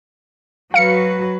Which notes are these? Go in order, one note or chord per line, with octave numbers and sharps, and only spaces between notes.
F#3 F#4 B4 F5 C#7